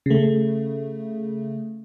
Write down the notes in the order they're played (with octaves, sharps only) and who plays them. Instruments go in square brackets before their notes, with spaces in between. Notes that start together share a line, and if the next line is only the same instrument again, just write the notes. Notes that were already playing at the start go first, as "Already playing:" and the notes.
[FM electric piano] C#3 A3